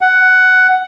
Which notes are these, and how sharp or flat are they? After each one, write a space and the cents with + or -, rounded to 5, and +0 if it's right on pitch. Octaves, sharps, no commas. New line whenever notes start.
F#5 +10